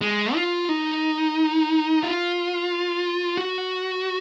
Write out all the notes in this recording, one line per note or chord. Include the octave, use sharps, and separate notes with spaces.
G#3
F4
D#4
F4
F#4